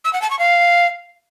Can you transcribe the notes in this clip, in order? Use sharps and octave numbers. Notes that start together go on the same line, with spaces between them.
E6
F#5
A5
C#6
F5